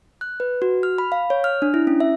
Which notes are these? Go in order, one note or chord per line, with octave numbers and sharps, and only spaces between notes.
F#6
B4
F#4
F6
B5
F5
C#5
F6
D4
E4
C#4
E5